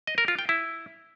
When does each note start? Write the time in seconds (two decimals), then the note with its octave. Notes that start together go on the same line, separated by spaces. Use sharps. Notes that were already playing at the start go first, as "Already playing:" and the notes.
0.07 D#5
0.18 A#4
0.28 F4
0.39 G5
0.49 E4